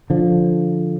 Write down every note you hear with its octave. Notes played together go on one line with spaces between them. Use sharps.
D3 F3